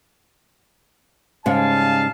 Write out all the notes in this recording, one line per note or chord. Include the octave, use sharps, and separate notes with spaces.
G#2 C#3 G3 F5 G#5 A5